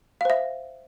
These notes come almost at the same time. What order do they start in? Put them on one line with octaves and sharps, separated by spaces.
F5 C5 E5